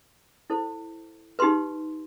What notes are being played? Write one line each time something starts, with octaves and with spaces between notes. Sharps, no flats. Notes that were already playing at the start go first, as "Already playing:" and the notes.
E4 A4 C5
D#4 G4 B4 C6